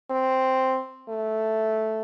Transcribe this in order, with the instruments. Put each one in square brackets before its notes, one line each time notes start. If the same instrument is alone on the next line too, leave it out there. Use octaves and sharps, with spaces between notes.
[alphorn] C4
A3